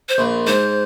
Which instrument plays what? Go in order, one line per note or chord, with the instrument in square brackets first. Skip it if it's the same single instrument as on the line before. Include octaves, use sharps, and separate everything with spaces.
[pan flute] C5
[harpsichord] A#1 A#2
[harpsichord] G#2 [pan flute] C5